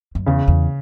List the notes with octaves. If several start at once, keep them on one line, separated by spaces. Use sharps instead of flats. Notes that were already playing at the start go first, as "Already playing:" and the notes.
F#2
E2 C#3
E2